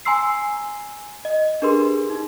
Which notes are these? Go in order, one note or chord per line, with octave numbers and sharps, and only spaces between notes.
G#5 A#5 C6 E6 C7
D#5
D4 G4 G#4 A#4 B4 C6
D#4